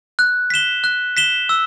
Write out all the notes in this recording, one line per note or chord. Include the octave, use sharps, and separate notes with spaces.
F#6
B6 E7 G7
F#6
B6 E7 G7
E6